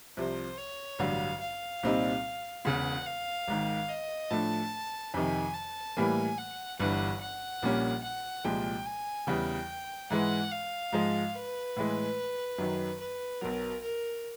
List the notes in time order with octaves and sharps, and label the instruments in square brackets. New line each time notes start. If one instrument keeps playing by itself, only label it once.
[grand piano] C2 C3 F3 [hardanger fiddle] C5
[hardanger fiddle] C#5
[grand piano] A1 G2 D3 F#3 [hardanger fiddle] F5
[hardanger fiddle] F5
[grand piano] C2 A#2 G3 C4 D#4
[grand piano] E1 E2 C#3 [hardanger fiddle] F#5
[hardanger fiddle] F5
[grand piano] G#1 G#2 D#3
[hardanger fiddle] D#5
[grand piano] A2 F3 A3 D4 [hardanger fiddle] A5
[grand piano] F2 C3 D#3 [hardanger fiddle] G#5
[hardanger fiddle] A5
[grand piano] A2 E3 G3 A#3 [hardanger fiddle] G#5
[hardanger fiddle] F#5
[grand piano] G1 G2 E3 [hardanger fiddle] F#5
[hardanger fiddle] F#5
[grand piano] A#1 A#2 G3 A#3 C#4
[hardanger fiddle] F#5
[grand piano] C2 A#2 F3 G#3 [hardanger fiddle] G5
[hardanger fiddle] G#5
[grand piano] E2 C#3 E3 G3 [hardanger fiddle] G5
[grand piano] G#2 E3 G#3 [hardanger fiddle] F#5
[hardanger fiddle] F5
[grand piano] G#2 F3 G#3
[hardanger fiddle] B4
[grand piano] A2 E3 G#3
F#2 D#3 F#3
[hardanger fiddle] B4
[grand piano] B1 B2 F#3 [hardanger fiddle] A#4
[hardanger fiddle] A#4